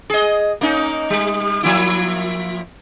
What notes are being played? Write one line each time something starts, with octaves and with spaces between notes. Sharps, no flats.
G#4 D#5
A#3 C#4 D#4
G3
F3 A#3 E4